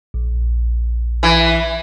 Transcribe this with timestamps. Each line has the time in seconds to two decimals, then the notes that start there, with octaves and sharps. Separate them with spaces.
0.14 A#1
1.23 E3